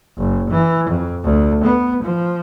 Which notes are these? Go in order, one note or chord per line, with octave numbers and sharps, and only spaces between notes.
F#1
E3
F2
D2
B3
F3